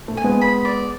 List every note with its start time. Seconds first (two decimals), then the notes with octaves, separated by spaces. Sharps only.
0.08 A3
0.17 G#5
0.24 G#3 B3
0.41 B5
0.65 D5